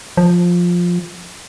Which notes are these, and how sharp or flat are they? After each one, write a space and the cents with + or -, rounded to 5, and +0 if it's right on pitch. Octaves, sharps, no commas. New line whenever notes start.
F3 +10